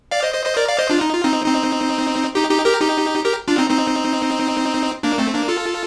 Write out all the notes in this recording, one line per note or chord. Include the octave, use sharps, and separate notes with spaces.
D5 F5
C5 D#5
C5 D#5
C5 D#5
A#4 D5
D5 F5
C5 D#5
D4 F4
D#4
F4
C4 D#4
C4 D#4
D#4 G4
D#4 G4
G4 A#4
D#4 G4
G4 A#4
D4 F4
C4 D#4
C4 D#4
A#3 D4
A3 C4
A#3 D4
F4 A4